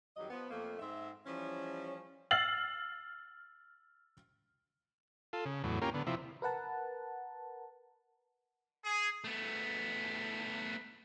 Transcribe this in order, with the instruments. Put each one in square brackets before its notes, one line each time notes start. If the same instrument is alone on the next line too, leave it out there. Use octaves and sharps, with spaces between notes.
[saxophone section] F2 D#3 F#3 G3 G4 D#5
F3 B3
F2 A3 A#3
G#2 C4 E5
E3 F3 G3 C#4
[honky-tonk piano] E6 F6 A6 C7 F#7
[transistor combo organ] F4 A4
C#3
E2 A2 F#3
A#3 C#4 F4 G4 A#4
D3 B3
C3 F3 E4
[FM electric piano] A#4 B4 F#5 A5
[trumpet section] G#4
[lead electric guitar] A3 B3